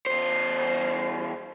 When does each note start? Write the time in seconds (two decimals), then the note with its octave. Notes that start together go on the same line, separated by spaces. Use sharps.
0.06 E2 C5